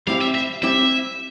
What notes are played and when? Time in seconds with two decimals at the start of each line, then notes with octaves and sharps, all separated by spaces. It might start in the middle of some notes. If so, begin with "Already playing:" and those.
0.07 G3 C4 E4 G4 F5
0.21 E5
0.35 E5
0.63 G3 C4 E4 G4 E5